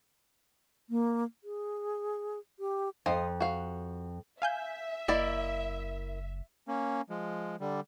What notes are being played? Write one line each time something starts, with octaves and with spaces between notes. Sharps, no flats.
A#3
G#4
G4
F2 C4 D#5 F5
F#4 F5
E5 F5 G#5 G6
F#1 A#3 E4 D5 D#5
A#3 C#4
F3 G#3
D3 G3